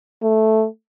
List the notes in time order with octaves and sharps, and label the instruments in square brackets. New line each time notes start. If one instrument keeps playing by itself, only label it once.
[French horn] A3